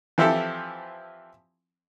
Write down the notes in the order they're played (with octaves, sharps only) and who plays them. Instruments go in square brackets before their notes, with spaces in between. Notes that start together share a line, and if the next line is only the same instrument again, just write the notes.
[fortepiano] E3 F3 C4 E4 G4 A4